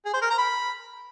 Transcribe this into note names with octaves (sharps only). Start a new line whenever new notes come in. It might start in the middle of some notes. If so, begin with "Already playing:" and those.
G#4
C5
A#4
A#5
B5